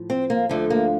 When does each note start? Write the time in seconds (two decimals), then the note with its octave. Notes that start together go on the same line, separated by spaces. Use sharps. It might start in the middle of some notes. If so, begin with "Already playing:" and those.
Already playing: A2 F3
0.10 C4
0.30 A#3
0.49 D2 D3 F3 A3
0.70 A#3